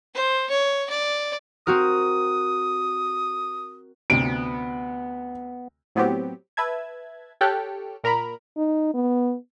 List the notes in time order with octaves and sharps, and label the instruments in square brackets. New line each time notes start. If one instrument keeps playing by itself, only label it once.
[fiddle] C5
C#5
D5
[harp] C4 F#4 A#4 [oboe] D#6
[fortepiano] D2 C3 [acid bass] B3 [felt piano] D7
[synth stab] A2 F#3 B3 C4 G4
B4 E5 A5 G#6
G4 A4 C#5 G5 F6 F#6
A#2 A#4 A#5 B5
[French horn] D#4
B3